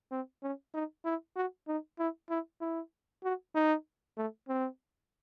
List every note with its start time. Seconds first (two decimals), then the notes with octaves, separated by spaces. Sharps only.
0.11 C4
0.43 C#4
0.74 D#4
1.05 E4
1.36 F#4
1.68 D#4
1.99 E4
2.30 E4
2.61 E4
3.24 F#4
3.55 D#4
4.17 A3
4.48 C4